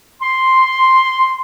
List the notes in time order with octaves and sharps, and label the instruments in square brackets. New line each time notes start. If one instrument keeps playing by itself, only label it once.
[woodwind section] C6